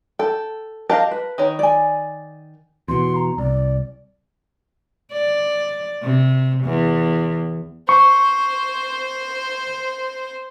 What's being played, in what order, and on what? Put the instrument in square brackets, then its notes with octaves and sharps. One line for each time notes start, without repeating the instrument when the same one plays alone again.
[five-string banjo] A4 [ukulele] G5
[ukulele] G4 D#5 F5 [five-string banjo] A#4 A5
[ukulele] B4
[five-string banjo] D#3 C#5
[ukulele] D5 G#5
[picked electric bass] E2 B2 [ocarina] C6
[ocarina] A#5
[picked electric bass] C2 [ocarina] D5
[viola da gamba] D5
C3
E2
[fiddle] C5 [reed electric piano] C#6